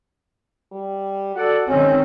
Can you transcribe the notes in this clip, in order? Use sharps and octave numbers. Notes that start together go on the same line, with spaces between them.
G3
F#4 A4 D5 F#5
D#3 G#3 C4 C#4